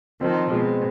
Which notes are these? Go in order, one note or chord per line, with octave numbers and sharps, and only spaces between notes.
D#3 F3 C4
B2 G#3